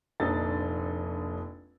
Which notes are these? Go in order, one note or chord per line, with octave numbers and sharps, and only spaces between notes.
F1 A#1 D4 D#4 E6 A6